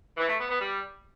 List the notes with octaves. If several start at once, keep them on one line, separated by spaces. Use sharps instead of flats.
E3
A3
B3
B3
G3